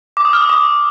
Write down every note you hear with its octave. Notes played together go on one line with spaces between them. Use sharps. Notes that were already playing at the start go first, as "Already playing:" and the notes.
D6
D#6
F6
D#6
D6